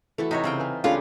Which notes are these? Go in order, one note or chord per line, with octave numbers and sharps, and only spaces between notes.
E3 A3 E4 F#4 A4
C3 D#4 F#4 C#5 D#5 B6
C#3 C4 E4 F4 G5
B4 G#5 F6
C#2 C#3 A3 D4 F4 G4 A4 B4